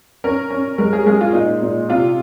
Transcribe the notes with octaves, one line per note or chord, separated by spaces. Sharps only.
C#4 A#4
C#4
G#3 A#4
G#4
G#3 G#4
F4
A#2 D#4
A#2
C3 F4